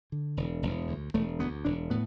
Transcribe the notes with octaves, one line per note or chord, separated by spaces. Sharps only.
D3
E1
E1
D2
E1 A3
D2 B3
E1 D4
A2 B3